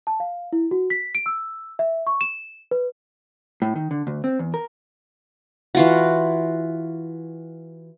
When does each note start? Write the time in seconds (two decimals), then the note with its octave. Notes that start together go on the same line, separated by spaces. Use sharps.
0.07 A5
0.20 F5
0.53 E4
0.71 F#4
0.90 B6
1.15 D7
1.26 E6
1.79 E5
2.07 C#6
2.21 E7
2.71 B4
3.62 A2
3.76 D#3
3.91 D3
4.07 D2
4.24 C4
4.39 E2
4.54 A#4
5.75 E3 F4 F#4